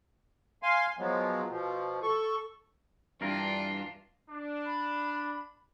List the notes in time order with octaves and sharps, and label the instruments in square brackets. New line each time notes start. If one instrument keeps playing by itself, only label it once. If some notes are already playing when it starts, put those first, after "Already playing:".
[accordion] F5 G#5 C6
F3 F#3 G#3 B3
B2 F3
A4 C#6
[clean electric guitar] G2 E3 A#4 [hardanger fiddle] D4 F4
[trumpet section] D4
[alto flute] B5